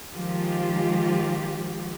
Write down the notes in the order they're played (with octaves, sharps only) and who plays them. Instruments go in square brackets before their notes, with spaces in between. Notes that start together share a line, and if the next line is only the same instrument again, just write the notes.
[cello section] D#3 F3 G#3 F4 G4